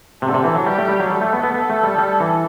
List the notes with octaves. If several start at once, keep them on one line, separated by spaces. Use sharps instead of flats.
C3 A4
D3
C3
E3
F#3
G3 G4
A3
G3
F#3
G3 A4
A3
B3
B3
B3
A3
G3
G3
E3